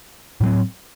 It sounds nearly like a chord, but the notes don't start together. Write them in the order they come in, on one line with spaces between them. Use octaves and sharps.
A2 F#3 C4